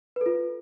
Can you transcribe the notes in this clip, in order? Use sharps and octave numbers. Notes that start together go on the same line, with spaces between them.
F4 A4 B4